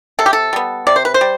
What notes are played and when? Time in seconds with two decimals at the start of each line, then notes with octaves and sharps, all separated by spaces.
0.19 C3 A4
0.26 G4
0.33 A4
0.53 G3 B3
0.87 C3 D5
0.96 C5
1.05 B4
1.14 C5
1.21 G3